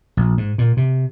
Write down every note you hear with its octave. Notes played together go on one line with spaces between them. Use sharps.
A#1
G#2
A#2
C3